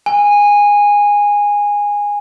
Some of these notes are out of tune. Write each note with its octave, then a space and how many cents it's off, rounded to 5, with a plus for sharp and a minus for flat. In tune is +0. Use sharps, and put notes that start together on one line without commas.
G#5 -15